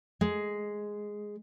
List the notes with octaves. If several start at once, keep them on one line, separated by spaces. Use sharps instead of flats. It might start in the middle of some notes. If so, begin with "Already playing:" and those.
G#3